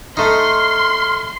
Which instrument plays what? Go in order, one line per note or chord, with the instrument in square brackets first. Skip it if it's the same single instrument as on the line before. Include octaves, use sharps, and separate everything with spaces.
[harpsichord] A3 D#4 [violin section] C6 [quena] F6